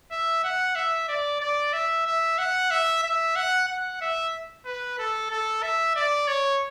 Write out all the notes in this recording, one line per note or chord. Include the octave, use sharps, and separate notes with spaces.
E5
F#5
E5
D5
D5
E5
E5
F#5
E5
E5
F#5
F#5
E5
B4
A4
A4
E5
D5
C#5